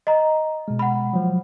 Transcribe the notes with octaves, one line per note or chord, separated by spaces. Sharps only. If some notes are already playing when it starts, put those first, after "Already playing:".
D#5 A#5
B2 G#3
F#5 B5
F3 F#3